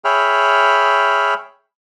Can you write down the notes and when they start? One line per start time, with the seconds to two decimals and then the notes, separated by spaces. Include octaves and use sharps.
0.05 G#4 C#5 E5 G5 B5 F6